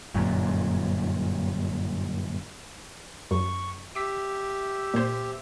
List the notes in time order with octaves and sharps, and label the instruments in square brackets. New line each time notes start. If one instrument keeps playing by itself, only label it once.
[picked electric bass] G1 F#2 A#2
[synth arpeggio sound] F#2 [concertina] C#6
[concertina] G4 E5 [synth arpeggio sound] D6 B6
[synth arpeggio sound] A#2 C5